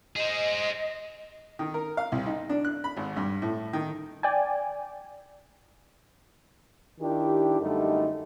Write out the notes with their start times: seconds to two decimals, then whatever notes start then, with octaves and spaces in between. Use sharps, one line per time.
0.16 G#4 C5 D#5
1.59 D#3
1.74 A#4
1.97 F5
2.12 C2
2.26 D#4
2.49 D4
2.65 F#6
2.84 B5
2.97 G#1
3.17 G2
3.42 A2
3.73 D#3
4.23 D5 G5 G#5
7.00 D#3 D4 E4 G4
7.61 F#2 D3 G3 A3 D#4